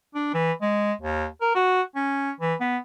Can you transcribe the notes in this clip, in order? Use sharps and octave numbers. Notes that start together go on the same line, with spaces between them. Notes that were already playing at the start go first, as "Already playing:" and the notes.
D4
E3
G#3
D#2
A#4
F#4
C#4
E3
B3